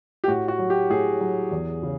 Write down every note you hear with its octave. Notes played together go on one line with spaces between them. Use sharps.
G4
A2 F#4
F#4
F#3
G4
A2 G#4
F#3
E2
C#3